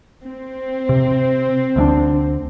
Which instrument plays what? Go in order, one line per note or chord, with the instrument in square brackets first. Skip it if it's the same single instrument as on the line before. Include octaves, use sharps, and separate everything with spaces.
[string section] C4
[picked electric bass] C3
D2 G#3 D4